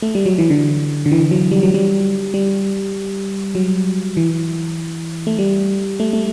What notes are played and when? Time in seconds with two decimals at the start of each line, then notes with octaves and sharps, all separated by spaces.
0.02 A3
0.15 G3
0.26 F#3
0.38 E3
0.50 D3
1.06 D3
1.11 E3
1.31 F#3
1.51 G3
1.63 F#3
1.74 G3
2.34 G3
3.55 F#3
4.17 E3
5.27 A3
5.38 G3
6.00 A3
6.13 A3